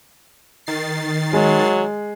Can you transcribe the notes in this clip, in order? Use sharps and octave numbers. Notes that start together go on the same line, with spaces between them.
D#3 A6 C7
F#3 G#3